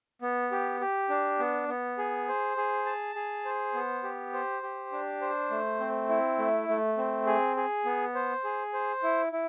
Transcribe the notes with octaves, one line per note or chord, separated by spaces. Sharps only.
B3
G4
G4
D4
B3
B3
G#4
C5
G#4
A5
G#4
C5
B3
G4
C5
G4
D4
C5
A3
C4
E4
A3
A3
C4
G#4
G#4
B3
C5
G#4
C5
E4
E4